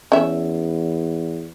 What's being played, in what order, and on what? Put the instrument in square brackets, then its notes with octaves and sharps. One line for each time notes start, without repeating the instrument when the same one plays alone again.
[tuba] E2 [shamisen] C#4 E5